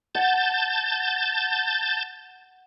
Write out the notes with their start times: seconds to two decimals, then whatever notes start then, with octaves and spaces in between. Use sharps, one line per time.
0.15 F#5 A5 G6 A6